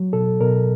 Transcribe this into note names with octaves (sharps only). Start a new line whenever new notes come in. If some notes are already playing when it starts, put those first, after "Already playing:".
Already playing: F#3
B2 A4
B2 A#4